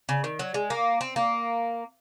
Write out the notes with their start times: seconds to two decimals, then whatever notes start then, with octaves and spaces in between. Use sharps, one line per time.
0.09 C#3
0.24 D#3
0.39 F#3
0.54 G#3
0.70 A#3
1.01 C4
1.16 A#3